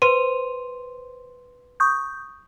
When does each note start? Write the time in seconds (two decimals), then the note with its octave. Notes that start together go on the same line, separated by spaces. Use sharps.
0.02 B4 C5 C6 D#7
1.80 C#6 D#6 G6